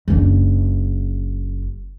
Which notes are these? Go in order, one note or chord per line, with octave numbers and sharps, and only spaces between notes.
F#1 D4